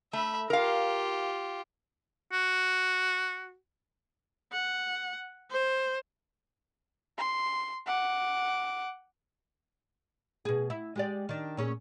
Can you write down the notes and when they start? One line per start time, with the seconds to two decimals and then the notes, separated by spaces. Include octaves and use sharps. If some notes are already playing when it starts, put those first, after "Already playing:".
0.13 A3 E5 B5
0.50 F4 G4 A#4 F5
2.33 F#4
4.53 F#5
5.51 C5
7.18 C6
7.87 F#5 D6
10.45 B2 G#4
10.70 E4
10.96 G#3 G4 D5
11.29 D#3 D4
11.57 A#2 C#4 G#4